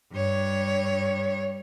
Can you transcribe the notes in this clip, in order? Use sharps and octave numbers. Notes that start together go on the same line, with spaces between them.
G2 C#5